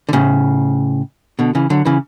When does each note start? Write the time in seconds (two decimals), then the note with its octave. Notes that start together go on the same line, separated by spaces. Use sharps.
0.09 D3
0.13 A2 C#3
1.39 B2 D3
1.55 C#3 E3
1.70 D3 F#3
1.85 C#3 E3